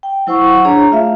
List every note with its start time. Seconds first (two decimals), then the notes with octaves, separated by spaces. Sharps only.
0.03 G5
0.27 F#3 E4 C5 F#5 C#6
0.64 D4 G#4 C#5 A#5
0.91 A3 F4 E5 F5